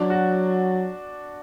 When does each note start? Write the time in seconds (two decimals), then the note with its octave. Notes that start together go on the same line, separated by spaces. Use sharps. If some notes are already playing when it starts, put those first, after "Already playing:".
Already playing: F#3 D4
0.10 F#4